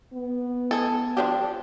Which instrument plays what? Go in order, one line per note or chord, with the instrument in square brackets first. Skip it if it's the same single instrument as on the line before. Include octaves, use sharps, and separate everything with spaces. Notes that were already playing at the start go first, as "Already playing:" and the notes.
[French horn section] B3
[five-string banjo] G#4 A4
[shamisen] F3 D4 G4